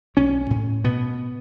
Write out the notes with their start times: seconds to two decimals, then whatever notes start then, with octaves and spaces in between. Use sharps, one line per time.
0.17 B1 C#4
0.50 A2
0.84 B2 B3